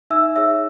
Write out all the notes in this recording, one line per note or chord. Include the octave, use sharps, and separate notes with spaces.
D#4 E5 E6
G#4 C#5 E5 E6